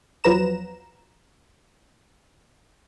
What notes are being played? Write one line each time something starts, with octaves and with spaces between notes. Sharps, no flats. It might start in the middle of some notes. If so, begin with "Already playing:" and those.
E2 F3 F#3 B4 A#5 E7